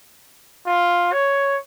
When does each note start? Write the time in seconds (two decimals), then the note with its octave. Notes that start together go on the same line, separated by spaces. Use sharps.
0.66 F4
1.13 C#5